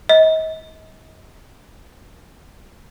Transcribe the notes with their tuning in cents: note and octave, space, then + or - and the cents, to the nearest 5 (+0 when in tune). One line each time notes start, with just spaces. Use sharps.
D#5 +35